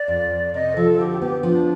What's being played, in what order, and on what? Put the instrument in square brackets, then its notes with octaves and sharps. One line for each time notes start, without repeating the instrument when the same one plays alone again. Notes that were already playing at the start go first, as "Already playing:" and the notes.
Already playing: [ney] D5
[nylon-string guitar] F2
F2
[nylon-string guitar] C3 [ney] D#5
[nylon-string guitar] F3 [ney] A4
[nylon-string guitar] D3 [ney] G4
[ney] G4
[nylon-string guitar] B3 [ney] G4
[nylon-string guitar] F3 [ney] D4